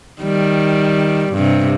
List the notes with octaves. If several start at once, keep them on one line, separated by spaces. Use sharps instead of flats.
D#3 G3
G2 C3